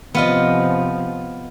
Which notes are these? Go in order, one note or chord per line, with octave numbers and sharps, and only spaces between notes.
C3 F3 B3 F4 D#5